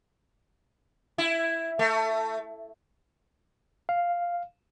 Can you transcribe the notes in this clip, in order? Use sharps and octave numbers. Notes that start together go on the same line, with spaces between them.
E4
A3
F5